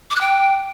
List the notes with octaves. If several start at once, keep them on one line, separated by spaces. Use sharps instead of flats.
D6
F#6
G5